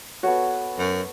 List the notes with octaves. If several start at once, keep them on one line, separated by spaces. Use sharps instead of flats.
B3 F#4 A4 C#5
F#2